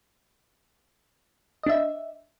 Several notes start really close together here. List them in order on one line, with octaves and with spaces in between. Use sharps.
D#5 D4 E5